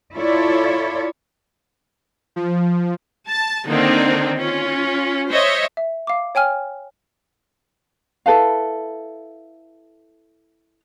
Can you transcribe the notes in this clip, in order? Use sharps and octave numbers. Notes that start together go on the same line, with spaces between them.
E4 F4 A4 C#5 D5
F3
A5
D3 D#3 A#3 C4 D4 D#4
C#4 F4
C5 C#5 D#5 E5
E5
F5 D6
C#5 G5 G#5 F6
E4 A4 B4 F5